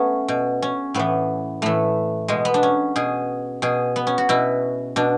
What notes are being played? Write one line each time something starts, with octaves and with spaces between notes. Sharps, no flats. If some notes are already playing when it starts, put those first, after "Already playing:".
Already playing: A3 B3 C#4
B2
C#4
A2 E3 B3
A2 E3 A3
B2 G#3
B3
D4
C#4
B2 G#4
B2 G#4
B3
C#4
F#4
B2 E4
B2 D4